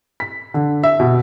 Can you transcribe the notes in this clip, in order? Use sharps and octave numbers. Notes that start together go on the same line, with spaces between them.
B6
D3
E5
B2